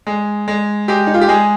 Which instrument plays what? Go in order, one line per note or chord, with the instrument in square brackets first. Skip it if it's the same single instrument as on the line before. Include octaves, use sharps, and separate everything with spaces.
[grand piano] G#3
G#3
G#3 G4
D#4
F4
G4
G#3 G#4